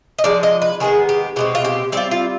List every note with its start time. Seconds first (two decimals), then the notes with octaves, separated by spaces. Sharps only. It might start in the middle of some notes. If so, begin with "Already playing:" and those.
0.18 D#5
0.24 F3 G#3 D#4 D5
0.43 D#5
0.62 B4
0.80 D#3 G#3 B3 G#4
1.09 G4
1.36 B2 G#3 C4 G4
1.55 F4
1.64 G4
1.92 G3 C4 F4 D5
2.11 F4